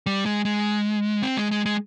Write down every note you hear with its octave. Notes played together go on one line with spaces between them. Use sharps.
G3
G#3
G#3
C4
G#3
G#3
G#3